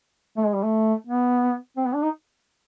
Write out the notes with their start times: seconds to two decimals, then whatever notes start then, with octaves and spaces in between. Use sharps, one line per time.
0.37 A3
0.46 G#3
0.55 G3
0.63 A3
1.07 B3
1.77 C4
1.86 B3
1.94 D4
2.03 D#4